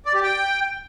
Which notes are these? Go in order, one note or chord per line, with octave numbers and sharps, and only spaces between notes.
D5
G4
G5